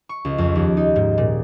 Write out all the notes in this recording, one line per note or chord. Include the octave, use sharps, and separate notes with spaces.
C#6
C#2
F2
D#2
D#4
G#2
A#2